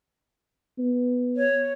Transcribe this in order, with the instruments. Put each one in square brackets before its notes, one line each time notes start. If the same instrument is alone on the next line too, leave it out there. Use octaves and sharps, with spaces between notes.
[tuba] B3
[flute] C#5